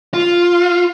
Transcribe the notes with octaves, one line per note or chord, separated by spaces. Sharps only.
F4